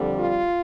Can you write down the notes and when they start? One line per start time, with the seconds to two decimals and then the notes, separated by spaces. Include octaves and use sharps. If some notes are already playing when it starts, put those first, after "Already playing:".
Already playing: F2 D3 G3
0.17 F4